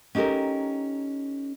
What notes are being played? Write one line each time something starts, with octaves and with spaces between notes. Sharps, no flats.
C#4 D#4 G4 A4 A#4